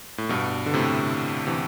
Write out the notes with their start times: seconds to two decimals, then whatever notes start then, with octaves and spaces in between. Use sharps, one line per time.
0.18 A2
0.29 G2 B2
0.66 D3
0.74 A2 C3
1.47 C3 E3